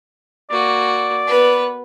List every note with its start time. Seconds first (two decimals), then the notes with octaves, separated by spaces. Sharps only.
0.50 A#3 F#4 D5
1.27 B3 B4